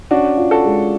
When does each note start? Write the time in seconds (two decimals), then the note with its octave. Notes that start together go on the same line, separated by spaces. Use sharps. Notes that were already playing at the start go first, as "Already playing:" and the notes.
0.11 C#4 D4 F#4
0.37 F4
0.51 F#4 A4
0.64 G#3